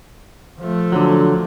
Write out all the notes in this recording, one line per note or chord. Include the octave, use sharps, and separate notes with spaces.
F3 A3
D3 F#3